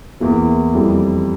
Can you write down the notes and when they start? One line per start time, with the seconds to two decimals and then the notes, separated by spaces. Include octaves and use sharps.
0.20 E2 E3 A#3
0.74 F2 E3 G3